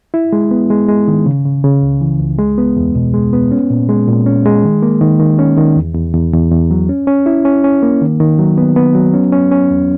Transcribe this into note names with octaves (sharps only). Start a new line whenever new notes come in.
E4
G#3
B3
G#3
G#3
D#3
C#3
C#3
C#3
C#2
E3
C#2
G#3
B3
E2
B2
G#3
B3
C#4
A#2
G#3
A#2
C#4
G#3
D#3
A#3
D#3
D#3
C#4
D#3
E2
E2
E2
E2
E2
F#3
C#4
C#4
E4
C#4
C#4
A#3
D#3
D#3
F#3
B3
B3
F#3
C#4
C#4
C#4
E2